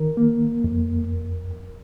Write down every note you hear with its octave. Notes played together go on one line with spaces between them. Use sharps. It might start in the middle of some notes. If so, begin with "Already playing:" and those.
Already playing: D#3 A#4
A#3
F2